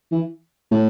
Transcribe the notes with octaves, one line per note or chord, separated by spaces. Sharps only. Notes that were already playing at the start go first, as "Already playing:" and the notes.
E3
A2